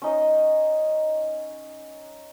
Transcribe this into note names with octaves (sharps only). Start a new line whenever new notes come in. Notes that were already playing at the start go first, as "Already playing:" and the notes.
C#4 D#4 D#5